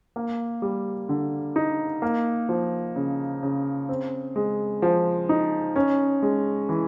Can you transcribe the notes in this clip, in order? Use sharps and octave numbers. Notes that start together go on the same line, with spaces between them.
A#3
G3
D3
D#4
A#3
F3
C#3
C#3
C4
G#3
F3
D#4
C#4
G#3
E3